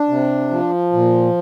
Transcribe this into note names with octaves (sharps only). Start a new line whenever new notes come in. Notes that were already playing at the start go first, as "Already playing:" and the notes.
Already playing: D4
C3
F3
A#2